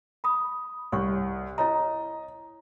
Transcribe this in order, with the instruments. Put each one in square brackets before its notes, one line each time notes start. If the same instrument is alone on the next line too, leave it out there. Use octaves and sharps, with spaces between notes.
[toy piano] B5 D#6
[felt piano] C2 [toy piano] C#5 C#6
[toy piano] E4 C#5 A#5 [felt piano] D#5